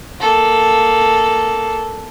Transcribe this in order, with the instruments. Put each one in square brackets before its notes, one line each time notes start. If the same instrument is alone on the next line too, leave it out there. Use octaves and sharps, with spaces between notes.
[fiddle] A#3 A4